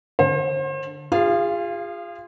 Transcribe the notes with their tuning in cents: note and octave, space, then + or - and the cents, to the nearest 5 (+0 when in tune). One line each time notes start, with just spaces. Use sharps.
D3 +0 C5 +40
F4 +0 G#4 -35 F5 -25